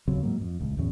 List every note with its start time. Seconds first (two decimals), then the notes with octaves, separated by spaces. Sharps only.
0.08 D#2 C#3 F#3 C4
0.23 G#2 F#3 A#3
0.41 F2
0.60 D#1 C#2
0.77 D1 E2 C#4